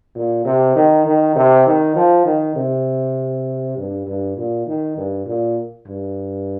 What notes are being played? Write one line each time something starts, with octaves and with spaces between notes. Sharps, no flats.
A#2
C3
D#3
D#3
C3
D#3
F3
D#3
C3
G2
G2
A#2
D#3
G2
A#2
G2